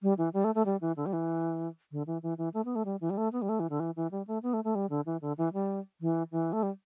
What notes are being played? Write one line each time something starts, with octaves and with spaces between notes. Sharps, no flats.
G3
E3
G3
A3
A3
G3
E3
D3
G3
E3
D3
E3
E3
E3
A3
B3
A3
G3
E3
G3
A3
B3
G3
A3
E3
D3
E3
E3
G3
A3
B3
A3
A3
G3
D3
E3
D3
E3
G3
E3
E3
A3
G3